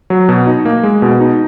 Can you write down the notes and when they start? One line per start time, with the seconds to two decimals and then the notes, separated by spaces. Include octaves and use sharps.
0.10 F#3
0.29 B2
0.47 D#4
0.65 A#3
0.83 G#3
1.02 B2
1.20 D#4